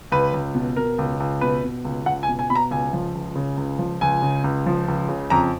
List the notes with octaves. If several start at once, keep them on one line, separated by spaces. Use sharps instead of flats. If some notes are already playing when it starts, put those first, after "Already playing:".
C#2 B4
C#2
B2
B2 A#4
C#2
C#2
B2 B4
B2
C#2
C#2 F#5
G#5
B2
G#5
B2 B5
A#5
C#2 G#5
F3
C#2
C#3
C#2
F3
C#2 G#5
C#3
C#2
F3
C#2
C#3
F2 A#5